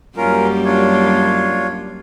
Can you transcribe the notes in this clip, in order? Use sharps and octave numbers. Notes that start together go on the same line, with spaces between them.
F#2 G3 A#3 C#4 F4 A#4
D4 F4 C#5